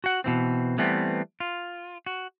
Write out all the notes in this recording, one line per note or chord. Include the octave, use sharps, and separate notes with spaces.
F#4 F#5
B2 E3 C4
E3 G3 A3 B3 C4
F4
F#4